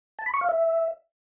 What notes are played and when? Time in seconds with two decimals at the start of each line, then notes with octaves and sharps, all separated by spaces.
0.19 A5
0.26 B5
0.34 C#6
0.41 F5
0.49 E5